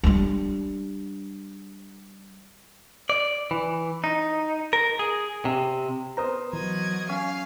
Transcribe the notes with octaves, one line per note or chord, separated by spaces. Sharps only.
G3 D4
D5
E3
D#4
A#4
G#4
C3
B3 A#4 C5 A#5 D#6
E3 F#3 D#5 G#6
C#4 F5